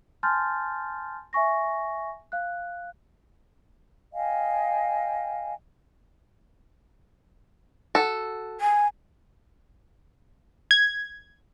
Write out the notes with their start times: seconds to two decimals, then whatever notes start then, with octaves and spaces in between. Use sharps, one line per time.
0.23 G#5 A5 C6 F6 G6 A6
1.33 E5 G#5 C#6 A#6
2.32 F5 F#6
4.13 D#5 F5 G5 G#5
7.95 F#4 A4
8.61 G#5
10.71 G#6